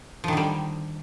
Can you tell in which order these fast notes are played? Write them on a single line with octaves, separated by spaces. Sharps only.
F3 D#3 D3 G3